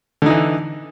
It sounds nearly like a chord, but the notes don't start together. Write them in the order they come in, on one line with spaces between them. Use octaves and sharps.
D3 D#4 E3